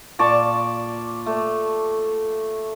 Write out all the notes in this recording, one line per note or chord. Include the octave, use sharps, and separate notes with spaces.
A#2 D5 A5 C#6
A3